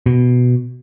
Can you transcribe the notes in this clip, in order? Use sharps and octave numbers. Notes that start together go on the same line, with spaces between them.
B2